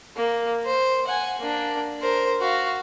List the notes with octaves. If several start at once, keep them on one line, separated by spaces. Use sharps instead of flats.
A#3
C5
F#5 G#5
A#3 D4
A#4 C5
F#4 F5